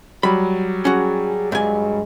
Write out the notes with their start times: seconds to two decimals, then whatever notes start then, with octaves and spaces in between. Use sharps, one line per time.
0.23 F#3 G3 B5
0.85 C#4 F#4 G#4
1.52 G2 G#3 G#5